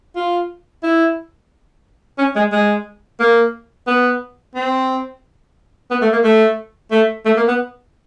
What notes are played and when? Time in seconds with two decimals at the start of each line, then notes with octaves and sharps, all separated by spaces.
0.16 F4
0.83 E4
2.18 C#4
2.36 G#3
2.52 G#3
3.20 A#3
3.87 B3
4.55 C4
5.91 B3
6.02 A3
6.12 A#3
6.24 A3
6.91 A3
7.25 A3
7.37 A#3
7.48 B3